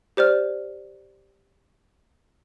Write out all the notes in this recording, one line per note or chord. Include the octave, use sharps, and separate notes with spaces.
G4 C5 D5 F6